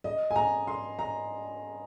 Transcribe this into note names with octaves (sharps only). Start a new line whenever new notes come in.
D#5
G#5
A#5
C6
A#5